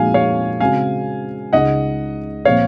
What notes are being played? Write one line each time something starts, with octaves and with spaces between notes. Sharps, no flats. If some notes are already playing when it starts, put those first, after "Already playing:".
Already playing: A#2 F3 G#3 D#4 F#4 F5 G#5
C#5 F5
C#3 G#3 C4 F#4 F5 G#5
C#2 C#3 G#3 D#4 D#5 F#5
A#2 F3 C4 C#5 F5